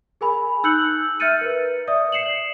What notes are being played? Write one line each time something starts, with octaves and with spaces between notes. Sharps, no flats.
G#4 A#4 G#5 B5
D#4 E6 F#6 G6 C#7 F#7
E5 F6 G6 A6 C#7 D#7
A#4 B4
D5 E5 D#6
C7 C#7 E7 F#7